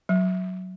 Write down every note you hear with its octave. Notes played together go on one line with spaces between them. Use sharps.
F#3